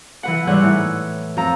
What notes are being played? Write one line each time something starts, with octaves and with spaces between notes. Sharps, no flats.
E3 B4 F#5
G#2 E3 G3 C#5 F#5 F#6
A2 E3
F2 A#5